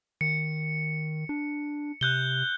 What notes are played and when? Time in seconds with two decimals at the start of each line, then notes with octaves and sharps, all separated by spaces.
0.21 D#3 C#7
1.29 D4
2.01 C3 F#6 G6 G7